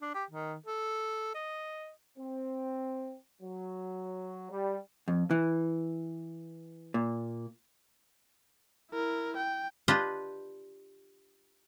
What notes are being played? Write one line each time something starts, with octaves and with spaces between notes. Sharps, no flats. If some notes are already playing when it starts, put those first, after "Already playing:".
D4
G4
D#3
A4
D#5
C4
F#3
G3
F2
E3
A#2
E4 A#4
G5
D4 F4 G4 B4 D#5